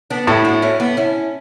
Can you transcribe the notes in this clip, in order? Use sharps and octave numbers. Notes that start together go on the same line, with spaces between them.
B3 D4
A2 E4 G4
D4 F#4
C#4 E4
B3 D4
C#4 E4